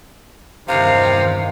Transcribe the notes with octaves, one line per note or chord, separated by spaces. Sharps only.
E2 G2 C3 D#3 F5